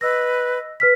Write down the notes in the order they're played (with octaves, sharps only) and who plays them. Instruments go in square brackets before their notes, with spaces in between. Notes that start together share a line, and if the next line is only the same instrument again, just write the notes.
[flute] B4 [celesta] D#5 E6 A#6
[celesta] B4 F6 B6